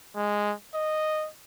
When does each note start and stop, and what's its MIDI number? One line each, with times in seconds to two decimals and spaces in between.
0.16 0.53 56
0.75 1.28 75